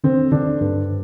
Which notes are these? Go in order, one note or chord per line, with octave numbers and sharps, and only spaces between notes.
D3 C4
D3 D4
G2